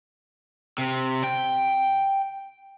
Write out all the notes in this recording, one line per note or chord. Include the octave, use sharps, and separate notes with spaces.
C3
G5